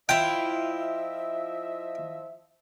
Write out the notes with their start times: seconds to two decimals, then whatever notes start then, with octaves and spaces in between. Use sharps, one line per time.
0.09 F3 E4 F4 D#5 E5 G5